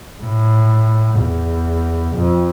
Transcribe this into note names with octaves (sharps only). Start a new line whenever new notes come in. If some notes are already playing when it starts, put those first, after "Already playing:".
A2
E2
F2